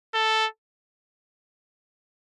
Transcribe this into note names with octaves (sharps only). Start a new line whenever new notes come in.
A4